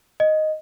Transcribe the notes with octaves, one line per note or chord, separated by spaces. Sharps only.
D#5